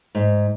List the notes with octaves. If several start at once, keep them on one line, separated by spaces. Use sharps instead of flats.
G#2